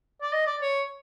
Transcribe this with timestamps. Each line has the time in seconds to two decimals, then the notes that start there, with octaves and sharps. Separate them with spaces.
0.22 D5
0.33 D#5
0.47 D5
0.62 C#5